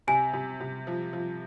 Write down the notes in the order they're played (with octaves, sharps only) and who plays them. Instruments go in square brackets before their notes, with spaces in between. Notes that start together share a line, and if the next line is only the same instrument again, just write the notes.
[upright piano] C3 [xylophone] G#5
[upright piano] C3
C3
F3
F3